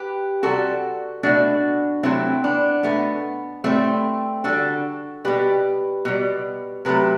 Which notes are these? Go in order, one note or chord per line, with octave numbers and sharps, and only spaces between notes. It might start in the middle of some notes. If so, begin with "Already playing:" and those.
Already playing: G4 B4
C3 G3 F#4 A4
B2 A3 D4 F#4
C3 F#3 A3 C4 E4
B3 D4
B2 A3 B3
A2 G3 A3 C4
D3 G3 F#4 A4
B2 G3 G4 B4
B2 G3
C3 F#3 A3 G4 B4